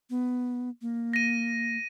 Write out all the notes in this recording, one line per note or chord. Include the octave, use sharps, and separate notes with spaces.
B3
A#3
A#6 D#7